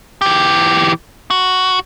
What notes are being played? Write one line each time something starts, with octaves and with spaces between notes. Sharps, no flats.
E3 G4
F#4